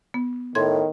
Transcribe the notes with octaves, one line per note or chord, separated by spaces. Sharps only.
B3
A2 D#3 C6 G#6